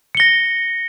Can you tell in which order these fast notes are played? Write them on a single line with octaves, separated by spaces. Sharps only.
C#7 G7 A#6